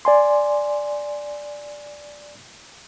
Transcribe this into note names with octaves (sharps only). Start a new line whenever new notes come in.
D5 G#5 C6